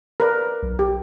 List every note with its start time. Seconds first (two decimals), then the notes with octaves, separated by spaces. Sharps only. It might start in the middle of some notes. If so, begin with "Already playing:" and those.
0.20 A#4 B4 D5
0.63 B1
0.79 G4